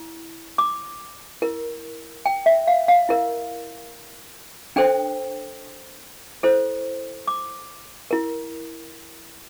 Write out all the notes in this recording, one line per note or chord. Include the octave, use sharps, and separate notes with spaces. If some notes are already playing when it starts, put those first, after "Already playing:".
Already playing: E4
D6
E4 A#4
G5
E5
F5
F5
E4 A#4
D4 A4 C5 G5
E4 A4 C5
D6
E4 A#4